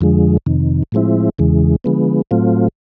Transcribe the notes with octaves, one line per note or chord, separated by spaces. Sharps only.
F2 D3 F3 G#3
F2 C3 D#3
A2 F3 G#3 C4 E4
E2 C#3 E3 G#3
D3 F3 G#3 B3
A2 F#3 A3 C4 F4